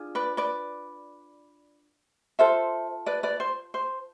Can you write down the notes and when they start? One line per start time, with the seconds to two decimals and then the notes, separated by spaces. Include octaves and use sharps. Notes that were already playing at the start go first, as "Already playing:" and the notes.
Already playing: D4 F4 G#4
0.15 B4 D5
0.37 B4 D5
2.39 F4 A4 C5 E5
3.06 B4 D5
3.23 B4 D5
3.40 C5
3.74 C5